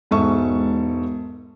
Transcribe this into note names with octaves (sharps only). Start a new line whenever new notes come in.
E1 G#2 A4 E5 A5 C#6